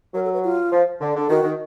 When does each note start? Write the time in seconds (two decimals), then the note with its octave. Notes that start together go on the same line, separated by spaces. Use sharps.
0.14 F#3 A#4
0.24 A4
0.33 B4
0.44 F4
0.72 F3
1.01 D3
1.16 D3
1.29 D#3 F#4
1.44 D#3